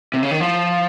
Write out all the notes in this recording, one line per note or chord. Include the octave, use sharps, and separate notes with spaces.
C3
C#3
D#3
F3